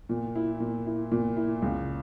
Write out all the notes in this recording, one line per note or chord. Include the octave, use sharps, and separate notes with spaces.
A#2
E4
A#2
E4
A#2
E4
C#2